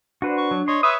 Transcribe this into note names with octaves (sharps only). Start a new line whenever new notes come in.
D4 F#4 B4 C5
C#6
F#3
C#5 D#5 C6
B4 C#5 E5 D#6